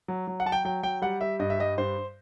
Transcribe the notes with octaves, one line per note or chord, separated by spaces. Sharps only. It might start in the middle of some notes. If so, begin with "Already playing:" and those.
F#3
F#3
F#5
F#3 A5
G5
F#3 G5
F#3 G5
G3 F#5
G3 E5
G2 D#5
E5
G3 D#5
G2 C5